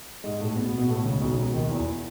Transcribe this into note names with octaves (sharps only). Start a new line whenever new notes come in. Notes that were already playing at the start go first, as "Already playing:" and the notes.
G#2 G#3
A2 A3
B2 B3
B2 B3
B2 B3
A2 A3
C#2 C#3
B1 B2
C#2 C#3
D#2 D#3
E2 E3